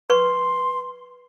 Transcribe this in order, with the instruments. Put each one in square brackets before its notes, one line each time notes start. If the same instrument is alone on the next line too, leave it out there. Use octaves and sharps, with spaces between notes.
[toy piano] B4 C#6 [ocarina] C6